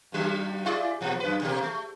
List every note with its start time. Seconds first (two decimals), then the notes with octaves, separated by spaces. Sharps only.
0.12 G2 F#3 D4
0.66 E4 G#4 D5
1.01 A#2 F3
1.20 F#2 B4
1.42 B2 A#3 G4
1.62 A3